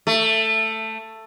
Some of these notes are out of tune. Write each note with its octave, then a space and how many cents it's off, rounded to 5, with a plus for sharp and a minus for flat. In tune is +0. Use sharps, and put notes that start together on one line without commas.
A3 +10